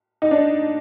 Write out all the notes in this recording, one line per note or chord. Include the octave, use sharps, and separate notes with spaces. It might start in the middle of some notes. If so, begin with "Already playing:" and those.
D#4
D4